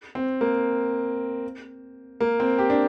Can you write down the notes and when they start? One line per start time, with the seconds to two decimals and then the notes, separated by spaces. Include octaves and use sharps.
0.15 C4
0.41 A#3
2.21 A#3
2.40 C4
2.58 G4
2.70 D4